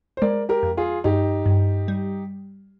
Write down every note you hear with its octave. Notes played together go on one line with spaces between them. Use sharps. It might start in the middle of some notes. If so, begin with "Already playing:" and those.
C5
G#3 A#4 D5
G4 A#4
F2
F4 G#4
G2 D#4 G4
G2
G3